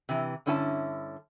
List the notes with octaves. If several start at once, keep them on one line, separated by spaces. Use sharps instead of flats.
C3 E3
G2 D3 C#4 E4 G#5 A5